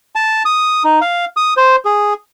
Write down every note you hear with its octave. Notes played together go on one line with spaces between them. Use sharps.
A5
D#6
D#4
F5
D#6
C5
G#4